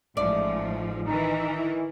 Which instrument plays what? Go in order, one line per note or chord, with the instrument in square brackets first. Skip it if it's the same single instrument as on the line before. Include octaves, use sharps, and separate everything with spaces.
[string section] A1 G#2 F3 [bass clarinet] A3 [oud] D5
[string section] D#3 E3 [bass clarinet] D#4
[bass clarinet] E4